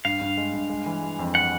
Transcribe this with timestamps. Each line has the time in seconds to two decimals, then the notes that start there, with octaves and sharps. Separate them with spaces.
0.05 G2 F5
0.21 G2
0.37 G#3
0.54 G2
0.70 G#3
0.86 E3
1.03 G#3
1.19 F2
1.35 F#5